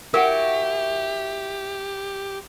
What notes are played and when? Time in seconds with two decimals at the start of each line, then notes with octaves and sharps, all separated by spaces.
0.14 E4 F#4 G4 A#4 F#5